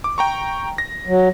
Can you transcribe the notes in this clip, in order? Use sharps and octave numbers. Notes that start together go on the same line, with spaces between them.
D6
G5 A#5 C#6
A#6
F#3